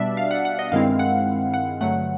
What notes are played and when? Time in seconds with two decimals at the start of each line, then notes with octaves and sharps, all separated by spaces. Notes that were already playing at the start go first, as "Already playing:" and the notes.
Already playing: B2 G3 B3 D4 D5 E5
0.17 F5
0.31 F#5
0.45 F#5
0.59 D#5
0.72 G2 D#3 G#3 C4 E4 F5
0.99 F#5
1.54 F#5
1.81 G2 D3 F#3 A3 F#5